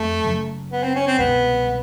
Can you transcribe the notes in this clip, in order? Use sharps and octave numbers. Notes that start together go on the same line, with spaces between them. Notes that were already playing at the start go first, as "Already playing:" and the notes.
Already playing: F2 A3
F#2 C#3 F#3
B3
C4
C#4
C4
C2 B2 G#3 B3